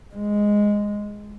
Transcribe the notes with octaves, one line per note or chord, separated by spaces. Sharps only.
G#3